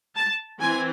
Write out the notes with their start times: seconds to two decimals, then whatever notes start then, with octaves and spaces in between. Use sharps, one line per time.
0.16 A5
0.60 E3 C4 G#5